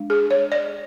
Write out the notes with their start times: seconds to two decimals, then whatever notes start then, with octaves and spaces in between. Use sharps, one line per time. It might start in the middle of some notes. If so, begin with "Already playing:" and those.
Already playing: G#3 D4
0.10 G#4
0.31 C#5
0.52 D5